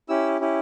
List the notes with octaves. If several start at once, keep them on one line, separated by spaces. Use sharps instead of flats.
C#4 E4 G4 E6
C#4 E4 G4